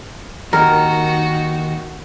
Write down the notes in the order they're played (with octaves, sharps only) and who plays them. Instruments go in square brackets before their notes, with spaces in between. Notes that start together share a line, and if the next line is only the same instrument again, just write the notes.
[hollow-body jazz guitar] D#2 [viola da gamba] D#3 D#4 F#4 [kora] A#4